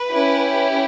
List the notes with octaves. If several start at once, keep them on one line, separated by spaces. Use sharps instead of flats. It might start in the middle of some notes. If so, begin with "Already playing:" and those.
Already playing: B4
C#4 E4 G4